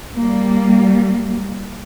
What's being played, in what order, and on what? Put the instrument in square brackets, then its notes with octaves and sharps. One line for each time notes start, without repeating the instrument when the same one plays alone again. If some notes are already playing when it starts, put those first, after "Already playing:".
[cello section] G3 A#3